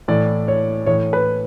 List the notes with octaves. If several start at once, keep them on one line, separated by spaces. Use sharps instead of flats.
A2 E3 D5
C#5
A2 E3 C#5
B4